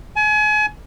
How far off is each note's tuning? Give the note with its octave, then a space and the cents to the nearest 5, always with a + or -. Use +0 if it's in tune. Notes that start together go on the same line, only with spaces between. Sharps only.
G#5 +35